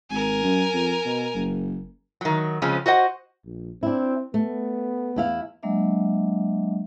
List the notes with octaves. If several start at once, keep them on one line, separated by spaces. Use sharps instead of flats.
G#1 A#4 G#5
F#2
F2
B2
F#1
D#3 F#3
C#3 F3 G#3 C4 C#4
F#4 C5 D#5 F#5
A#1
C4 D4 E4
A3 B3
E2 E4 F5
F#3 G#3 A#3 D4 D#5 E5